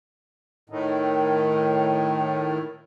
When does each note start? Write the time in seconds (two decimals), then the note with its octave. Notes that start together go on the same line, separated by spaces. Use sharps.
0.70 A2 D#3